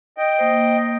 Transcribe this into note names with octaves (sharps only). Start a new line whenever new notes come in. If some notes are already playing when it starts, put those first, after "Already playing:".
D#5 G5
A#3 C5